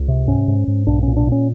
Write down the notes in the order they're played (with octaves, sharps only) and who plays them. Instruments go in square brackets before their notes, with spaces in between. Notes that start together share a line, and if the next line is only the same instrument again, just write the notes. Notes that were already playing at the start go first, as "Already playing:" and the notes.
Already playing: [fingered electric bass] C#2
C3
G#2 C#4
G#2
G#2
B1 D4
A#2 C#4
D4
A#2
C#4